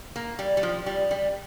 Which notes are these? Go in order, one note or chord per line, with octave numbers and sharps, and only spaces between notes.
A#3
G3
G3
F3
G3
G3